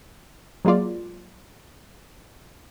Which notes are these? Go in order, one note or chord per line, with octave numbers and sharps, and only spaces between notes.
F#3 G#3 A#3 F4 D5